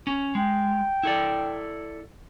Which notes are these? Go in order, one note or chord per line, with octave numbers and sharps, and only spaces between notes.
C#4
G#3 G5
E4 A4 D5